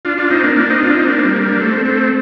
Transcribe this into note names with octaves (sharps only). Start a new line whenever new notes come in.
D4 F4
D4 F4
C4 D#4
A#3 D4
A#3 D4
C4 D#4
D4 F4
C4 D#4
A#3 D4
C4
G3 A#3
G3 A#3
D4
A3 C4
A3 C4